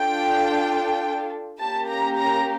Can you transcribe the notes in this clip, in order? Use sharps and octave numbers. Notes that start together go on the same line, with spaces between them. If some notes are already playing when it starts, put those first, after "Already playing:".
Already playing: D4 F4 A4 G5
A#3 C#4 G4 A5
A#5
A#5